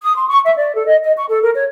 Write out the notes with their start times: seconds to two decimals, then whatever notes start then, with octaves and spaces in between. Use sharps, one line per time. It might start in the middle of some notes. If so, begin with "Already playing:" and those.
0.02 D#6
0.15 C6
0.28 C#6
0.45 E5
0.57 D5
0.75 A4
0.87 D#5
1.03 D#5
1.16 C#6
1.29 A4
1.41 A#4
1.55 C#5